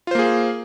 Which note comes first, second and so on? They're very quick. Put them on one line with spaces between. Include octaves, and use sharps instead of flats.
F4 C5 A#3 G#4